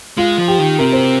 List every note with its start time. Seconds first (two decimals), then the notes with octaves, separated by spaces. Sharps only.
0.17 G#3 F4
0.38 F3
0.48 G4
0.59 D#3
0.79 C3 A#4
0.92 C5